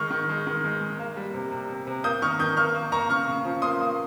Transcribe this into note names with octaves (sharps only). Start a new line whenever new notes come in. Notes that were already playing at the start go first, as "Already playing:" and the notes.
Already playing: D#3 G#3 C#6 F6
D#3
G#3
D#3
G#3
G#3
A#3
G3
C3
C3
C3
C3
A#3 D#6 G6
D#3 C#6 F6
D#3 D#6 G6
A#3 C#6 F6
A#3
A#3 A#5 C#6
C#3 C#6 F6
C#3
F3
A#3 C6 D#6
A#3